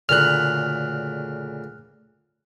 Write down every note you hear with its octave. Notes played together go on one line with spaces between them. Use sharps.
D2 A#2 C#3 F6 F#6